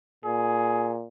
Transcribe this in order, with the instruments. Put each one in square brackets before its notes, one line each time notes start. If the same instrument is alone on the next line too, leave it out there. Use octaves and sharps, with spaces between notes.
[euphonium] A#2 [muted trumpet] G#4